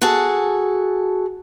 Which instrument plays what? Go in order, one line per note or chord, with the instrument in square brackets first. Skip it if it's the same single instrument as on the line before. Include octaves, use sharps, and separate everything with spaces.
[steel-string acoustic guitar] F#4 G#4 A4 A5